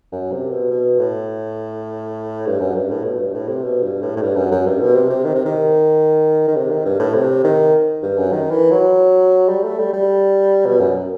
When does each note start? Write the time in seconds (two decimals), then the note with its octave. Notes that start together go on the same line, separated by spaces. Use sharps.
0.12 F#2
0.32 C3
0.51 B2
0.71 B2
0.99 A2
2.47 G2
2.60 F#2
2.75 G2
2.91 A2
3.04 B2
3.19 G2
3.35 A2
3.49 C3
3.63 B2
3.83 G2
4.03 A2
4.16 A2
4.21 G2
4.36 F#2
4.51 F#2
4.66 G2
4.81 B2
4.95 C3
5.10 C3
5.24 D#3
5.35 C3
5.45 D#3
6.48 D#3
6.56 C3
6.71 D#3
6.85 G2
6.99 A2
7.15 C3
7.44 D#3
8.02 G2
8.17 F#2
8.32 D#3
8.51 E3
8.71 F#3
9.49 G3
9.63 A3
9.78 G3
9.93 G3
10.65 B2
10.80 F#2